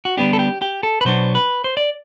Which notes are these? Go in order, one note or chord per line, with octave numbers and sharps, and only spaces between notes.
F#4
D3 G3 B3 D4 G4
A4
G4
G4
A4
B4
B2 F#3 B3 D4 C5
B4
C5
D5